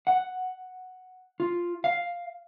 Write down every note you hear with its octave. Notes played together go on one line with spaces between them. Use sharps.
F#5
F4
F5